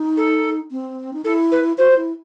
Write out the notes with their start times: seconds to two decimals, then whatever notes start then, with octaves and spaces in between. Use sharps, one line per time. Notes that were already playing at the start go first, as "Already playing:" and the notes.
Already playing: D#4
0.17 A4
0.71 C4
1.14 D#4
1.24 E4 A4
1.52 B4
1.78 F#4 C5
1.92 F#4
1.96 E4